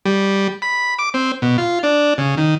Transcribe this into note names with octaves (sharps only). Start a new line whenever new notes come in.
G3
B5
D6
C4
B2
F4
D4
C#3
D#3